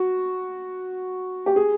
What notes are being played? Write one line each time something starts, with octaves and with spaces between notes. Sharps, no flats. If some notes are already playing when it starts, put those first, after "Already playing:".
Already playing: F#4
G4
G#4